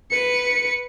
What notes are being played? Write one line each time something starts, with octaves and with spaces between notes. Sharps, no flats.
B4 C#7